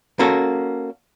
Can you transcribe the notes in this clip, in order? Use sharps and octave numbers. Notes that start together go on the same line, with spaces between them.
A#3 C#4 F#4 A4